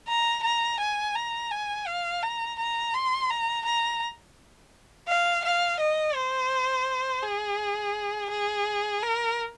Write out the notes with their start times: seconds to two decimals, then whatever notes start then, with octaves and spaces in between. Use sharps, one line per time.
0.08 A#5
0.43 A#5
0.80 G#5
1.15 A#5
1.51 G#5
1.87 F5
2.22 A#5
2.59 A#5
2.94 C6
3.30 A#5
3.65 A#5
5.08 F5
5.44 F5
5.80 D#5
6.15 C5
7.23 G#4
8.30 G#4
9.02 A#4